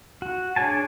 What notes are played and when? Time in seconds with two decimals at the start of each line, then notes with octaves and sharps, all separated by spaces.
0.22 F#4
0.56 D4 G#4 C#5 G#5 A5